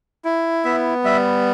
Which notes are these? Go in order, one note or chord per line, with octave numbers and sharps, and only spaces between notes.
E4
B3 E5
G3 E5